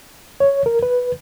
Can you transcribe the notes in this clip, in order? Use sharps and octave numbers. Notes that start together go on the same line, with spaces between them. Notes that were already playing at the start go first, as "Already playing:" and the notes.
C#5
A#4
B4